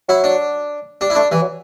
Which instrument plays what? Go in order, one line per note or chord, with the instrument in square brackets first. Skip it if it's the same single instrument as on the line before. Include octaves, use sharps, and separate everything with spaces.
[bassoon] F#3 [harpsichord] E4
[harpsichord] D4
[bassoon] G3 [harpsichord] D4
[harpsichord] E4
[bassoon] A3 [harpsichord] D4
[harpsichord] E3 [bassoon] G3
[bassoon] F#3